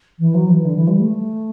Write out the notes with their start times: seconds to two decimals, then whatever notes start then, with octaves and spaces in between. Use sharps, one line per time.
0.19 E3
0.34 F#3
0.49 E3
0.65 D3
0.76 E3
0.87 G3
0.99 A3